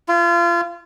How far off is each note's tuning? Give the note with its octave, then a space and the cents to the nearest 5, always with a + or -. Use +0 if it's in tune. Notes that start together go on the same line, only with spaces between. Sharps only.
F4 -30